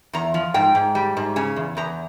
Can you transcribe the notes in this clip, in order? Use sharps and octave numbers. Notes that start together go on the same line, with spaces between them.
E2 A#5
F3
G#2 G5
G#2
G3
G#2
C#3 G#5
E2
E2 A#5